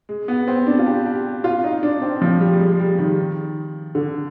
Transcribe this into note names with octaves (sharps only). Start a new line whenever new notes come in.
G#3
B3
C4
D4
F4
G4
G4
F4
D#4
D4
C4
F3
G3
G3
G#3
G#3
G3
D#3
D3